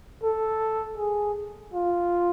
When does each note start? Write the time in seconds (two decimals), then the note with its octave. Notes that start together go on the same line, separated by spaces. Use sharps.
0.23 A4
0.98 G#4
1.74 F4